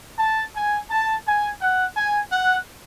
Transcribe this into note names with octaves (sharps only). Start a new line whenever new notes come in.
A5
G#5
A5
G#5
F#5
G#5
F#5